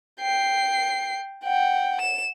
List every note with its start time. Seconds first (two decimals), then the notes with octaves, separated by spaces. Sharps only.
0.21 G5 C7
1.44 F#5 G5
2.01 E7